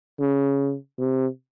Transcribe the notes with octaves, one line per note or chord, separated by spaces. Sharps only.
C#3
C3